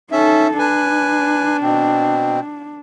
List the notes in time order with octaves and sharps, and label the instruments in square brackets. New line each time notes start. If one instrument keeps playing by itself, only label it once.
[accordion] C#4 E5 [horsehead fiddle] D#4 A4
[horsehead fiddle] D4 [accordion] B4 G#5
[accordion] B2 C4